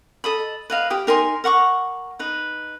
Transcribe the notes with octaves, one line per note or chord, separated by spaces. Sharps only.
A4 D#5 B5
B4 D#5 F5
G4 G5 D#6
D#4 A#4 G#5 C6
A#4 F#5 C#6 D6
D#4 B4